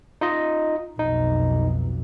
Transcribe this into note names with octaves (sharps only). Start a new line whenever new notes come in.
D#4 F4 D#5
B1 F2 D#4